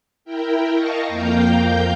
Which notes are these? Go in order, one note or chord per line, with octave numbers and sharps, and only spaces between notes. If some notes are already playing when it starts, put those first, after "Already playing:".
E4 A#4 G5
D#5 F5 A5 A#5 C#6
F2 A#3 F5 G5 A#5 G6